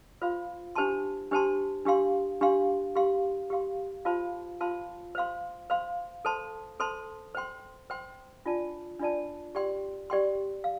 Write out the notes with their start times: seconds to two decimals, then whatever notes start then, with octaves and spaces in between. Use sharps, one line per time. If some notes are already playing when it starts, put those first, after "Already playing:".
0.22 F4 C5 F5 C6
0.75 D4 G4 C5 A5 C6
1.31 D4 G4 C5 A5 C6
1.85 D4 G4 F5 C6
2.41 D4 G4 F5 C6
2.96 G4 F5 C6
3.50 G4 F5 C6
4.05 F4 C5 F5 A5 C6
4.61 F4 C5 F5 A5 C6
5.15 C5 F5 C6
5.70 C5 F5 C6
6.25 A4 C5 A5 C6
6.80 A4 C5 A5 C6
7.35 C5 G5 C6
7.90 C5 G5 C6
8.45 D4 F4 D5 A5
8.99 D4 F4 D5 A5
9.55 G4 D5 G5 C6
10.10 G4 D5 G5 C6
10.64 F5